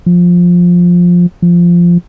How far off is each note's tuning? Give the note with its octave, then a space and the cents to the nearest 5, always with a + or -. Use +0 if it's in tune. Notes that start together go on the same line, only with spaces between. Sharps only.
F3 +10
F3 -10